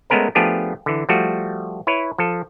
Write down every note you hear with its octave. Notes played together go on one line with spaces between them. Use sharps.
G#3 A3 B3 C#4 A#4 C5
F3 A3 B3 D4 G4 G#4
D3 E3
F3 G3 A3 F#4
E4 B4 C#5
F3 A4